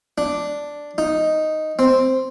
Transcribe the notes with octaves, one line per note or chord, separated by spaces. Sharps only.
D4
D#4
C4